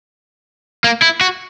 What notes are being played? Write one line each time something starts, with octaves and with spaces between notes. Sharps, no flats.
A#3
E4
F#4